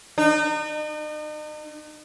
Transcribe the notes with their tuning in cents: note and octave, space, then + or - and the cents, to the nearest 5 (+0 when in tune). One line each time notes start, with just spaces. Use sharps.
D#4 -40